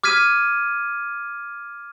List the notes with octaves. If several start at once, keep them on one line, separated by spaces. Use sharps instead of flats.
D6 F6 G#6 B6 D#7